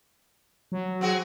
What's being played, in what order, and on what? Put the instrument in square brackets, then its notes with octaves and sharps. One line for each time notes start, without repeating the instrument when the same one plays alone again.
[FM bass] F#3
[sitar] C4 F#4 G#4